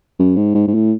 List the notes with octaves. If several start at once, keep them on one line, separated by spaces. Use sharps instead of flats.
F#2
G#2
G#2
G#2
A2